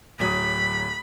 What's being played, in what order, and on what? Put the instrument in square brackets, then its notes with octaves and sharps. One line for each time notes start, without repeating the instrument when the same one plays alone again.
[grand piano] D1 F#3 D#6 [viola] B5